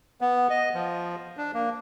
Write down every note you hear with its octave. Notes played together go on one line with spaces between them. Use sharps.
B3
D#5
F3
D4
A#3